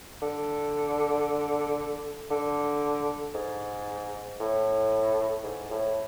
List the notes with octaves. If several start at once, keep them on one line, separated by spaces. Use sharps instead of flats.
D3
D3
G#2
A2
G#2
A2